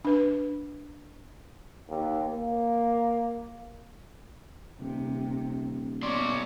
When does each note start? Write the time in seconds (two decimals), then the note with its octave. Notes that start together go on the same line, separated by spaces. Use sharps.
0.05 D4 B4
1.89 D#2
2.27 A#3
4.80 D#1 C3
6.03 B2 C#5 D5 C6